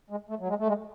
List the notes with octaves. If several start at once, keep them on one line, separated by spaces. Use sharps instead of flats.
G#3
A3
F#3
G#3
A3
G#3